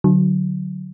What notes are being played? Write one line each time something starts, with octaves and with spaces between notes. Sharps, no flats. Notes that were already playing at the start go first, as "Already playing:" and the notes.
D3 F#3